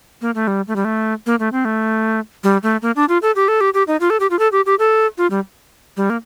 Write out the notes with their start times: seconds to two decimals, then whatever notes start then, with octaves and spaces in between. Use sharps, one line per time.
0.22 A#3
0.35 A3
0.47 G3
0.68 A3
0.76 G3
0.85 A3
1.26 A#3
1.40 A3
1.52 C4
1.65 A3
2.44 G3
2.63 A3
2.82 A#3
2.96 D4
3.09 F4
3.22 A4
3.36 G4
3.48 A4
3.61 G4
3.74 G4
3.87 D#4
4.00 F4
4.10 A4
4.20 G4
4.30 F4
4.39 A4
4.52 G4
4.66 G4
4.79 A4
5.18 F4
5.31 G3
5.97 G3
6.10 A#3